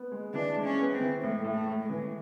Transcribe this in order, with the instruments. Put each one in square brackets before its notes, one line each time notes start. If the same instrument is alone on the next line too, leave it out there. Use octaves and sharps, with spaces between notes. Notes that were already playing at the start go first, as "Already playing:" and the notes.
Already playing: [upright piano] B3
G#3
[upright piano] E3 [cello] D4
[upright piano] G#3
[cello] C#4
[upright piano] B3
[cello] C4
[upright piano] E3
[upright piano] A2 [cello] G#3
[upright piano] A2
[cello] A3
[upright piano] A2
[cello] G#3
[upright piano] E3